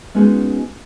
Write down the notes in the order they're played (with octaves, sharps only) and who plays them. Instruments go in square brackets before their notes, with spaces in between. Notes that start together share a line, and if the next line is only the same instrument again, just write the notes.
[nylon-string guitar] G#3 B3 C#4 D#4 F#4 G#4